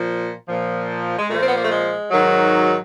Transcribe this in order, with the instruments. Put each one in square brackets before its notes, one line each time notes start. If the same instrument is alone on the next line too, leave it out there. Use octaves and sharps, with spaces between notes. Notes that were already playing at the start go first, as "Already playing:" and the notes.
Already playing: [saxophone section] A#2 F3
A#2 F3
G#3
A#2 F3 A3
C4
B3
A#3
A3
G#3
G#2 D#3 F#3